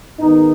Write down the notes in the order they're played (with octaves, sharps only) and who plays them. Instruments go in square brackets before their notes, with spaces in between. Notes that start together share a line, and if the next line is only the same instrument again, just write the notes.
[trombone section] G#2 D#3 B3 D#4